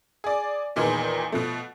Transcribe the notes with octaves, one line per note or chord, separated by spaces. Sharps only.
G#4 D5
E2 A#2 D#3 D#4 G#4 B4
B2 F3 A3